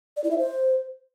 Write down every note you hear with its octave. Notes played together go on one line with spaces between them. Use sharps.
D5
E4
E5
C5